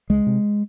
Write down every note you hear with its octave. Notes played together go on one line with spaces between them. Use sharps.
C#2 G#3
C3